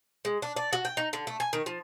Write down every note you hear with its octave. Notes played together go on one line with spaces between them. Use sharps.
G#3
D4
D5
F#4
G5
D#4
D3
A3
G#5
D#3
F3